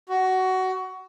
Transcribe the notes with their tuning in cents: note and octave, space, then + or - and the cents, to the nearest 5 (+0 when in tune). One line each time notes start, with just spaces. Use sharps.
F#4 +15